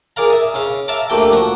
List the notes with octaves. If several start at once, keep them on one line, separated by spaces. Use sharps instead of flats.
G#4 A#4 D5 F5 A#5
E5 D#6
C#3 F5
E5 F5 A5 A#5 D6
D2 A3 A#3 G4 G5
F3 F#4